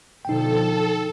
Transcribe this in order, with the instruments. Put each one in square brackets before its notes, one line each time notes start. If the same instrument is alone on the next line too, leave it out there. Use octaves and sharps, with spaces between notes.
[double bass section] B2 D3 F3 [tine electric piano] D#4 G5 [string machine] A4